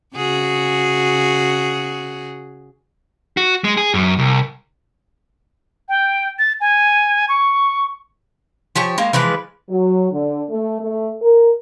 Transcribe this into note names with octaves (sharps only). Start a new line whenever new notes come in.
C#3 F#4 G#4
F#4
G#3
G#4
F#2
C2
G5
A6
G#5
C#6
F3 G4 C#5 G#5
G#3 A#3
E3 F3 G#3 B4
F#3
D3
A3
A3
A#4